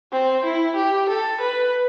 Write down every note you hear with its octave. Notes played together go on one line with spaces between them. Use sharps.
C4
E4
G4
A4
B4